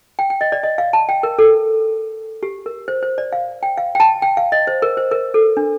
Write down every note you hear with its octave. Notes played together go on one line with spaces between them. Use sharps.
G5
G5
D#5
D5
D#5
F5
A5
G5
A#4
A4
G4
A#4
C5
C5
D5
F5
G5
F5
G5
A5
G5
F5
D#5
C5
A#4
C5
A#4
A4
D4